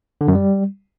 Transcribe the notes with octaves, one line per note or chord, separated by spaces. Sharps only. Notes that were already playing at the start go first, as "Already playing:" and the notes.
D3
F#2
G3